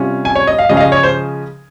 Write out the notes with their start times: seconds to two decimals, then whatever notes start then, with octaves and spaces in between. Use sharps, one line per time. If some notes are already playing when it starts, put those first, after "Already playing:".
Already playing: C3 G3 C#4 F4
0.25 G#5
0.35 C#5
0.47 D#5
0.59 F5
0.69 C#3 F3 G#3 C#4 D#5
0.77 F5
0.80 D#5
0.92 C#5
1.03 C5